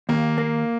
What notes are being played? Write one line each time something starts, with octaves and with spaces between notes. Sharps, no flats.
D#2 A#3
A#3